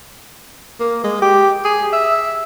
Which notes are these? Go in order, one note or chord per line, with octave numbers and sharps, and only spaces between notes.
A#3
G#3
G4
G#4
E5